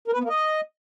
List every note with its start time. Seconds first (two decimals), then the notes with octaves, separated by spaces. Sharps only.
0.08 A#4
0.13 B4
0.19 B3
0.24 A#3
0.29 D#5